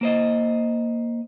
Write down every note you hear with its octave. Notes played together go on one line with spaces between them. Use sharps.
A#3 C5 D#5